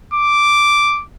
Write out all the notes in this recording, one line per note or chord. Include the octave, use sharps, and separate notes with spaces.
D6